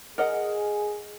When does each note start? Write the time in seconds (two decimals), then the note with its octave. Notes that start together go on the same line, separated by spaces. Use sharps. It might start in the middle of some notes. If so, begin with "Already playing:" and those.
0.18 G#4 A#4 D#5 F#5